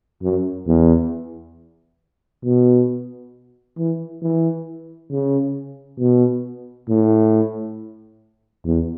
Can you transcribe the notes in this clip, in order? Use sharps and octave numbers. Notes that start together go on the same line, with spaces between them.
F#2
E2
B2
E3
E3
C#3
B2
A2
E2